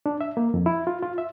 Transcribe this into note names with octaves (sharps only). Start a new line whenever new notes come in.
D4
E5
A#3
F2
E4
F4
F4
E5